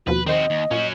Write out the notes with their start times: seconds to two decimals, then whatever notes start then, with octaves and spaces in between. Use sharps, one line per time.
0.07 D#2 B2 F3 F#4 B4
0.26 D#3 C4 F#4 C5 D#5
0.50 D#2
0.71 A#2 C#4 F#4